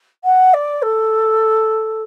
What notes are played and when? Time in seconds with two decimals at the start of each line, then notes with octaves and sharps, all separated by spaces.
0.24 F#5
0.54 D5
0.82 A4